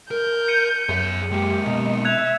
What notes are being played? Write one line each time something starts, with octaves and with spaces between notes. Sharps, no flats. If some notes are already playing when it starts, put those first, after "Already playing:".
A#4 G6
C#7 D#7
F#2 G#4 E5
G#3 A#3 G4
B2 D#4
E5 F#6 G#6 F7